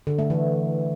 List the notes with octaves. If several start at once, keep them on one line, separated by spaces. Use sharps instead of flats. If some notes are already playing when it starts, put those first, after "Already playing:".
D3
A3
E3